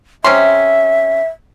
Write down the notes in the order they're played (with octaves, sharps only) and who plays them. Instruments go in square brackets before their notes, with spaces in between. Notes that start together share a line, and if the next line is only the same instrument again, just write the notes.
[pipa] C3 C#4 C6 [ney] E5